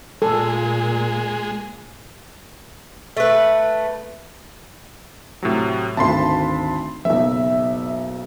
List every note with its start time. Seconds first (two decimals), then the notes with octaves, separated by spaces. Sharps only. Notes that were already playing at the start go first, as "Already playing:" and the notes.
0.22 A#2 G#3 A4
3.17 A3 B4
5.43 A2 C3 F#3
5.97 G#1 D2 A5 B5 C6
7.05 F#1 B1 E5